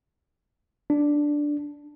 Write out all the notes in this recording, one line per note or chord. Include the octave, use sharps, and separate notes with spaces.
D4